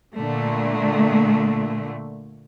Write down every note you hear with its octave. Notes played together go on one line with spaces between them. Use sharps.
A#2 D3 A3